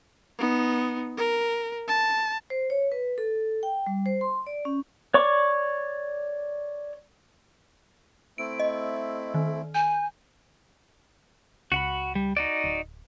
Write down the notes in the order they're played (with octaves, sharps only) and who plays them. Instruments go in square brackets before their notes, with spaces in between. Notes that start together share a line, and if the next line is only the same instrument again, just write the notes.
[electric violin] B3 D#4
A#4
A5
[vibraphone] C5
C#5
B4
A4
G5
G3
C5
C6
D5
C#4
[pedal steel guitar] C#5 D5 C#6 D6
[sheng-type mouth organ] A3 C4 E4 [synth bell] D7
[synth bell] D#5
D#3
[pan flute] G#5 [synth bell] G6
[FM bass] C#2 [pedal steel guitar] F#4 F#5 B5
[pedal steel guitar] G3
D#4 F#4 D5
[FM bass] D1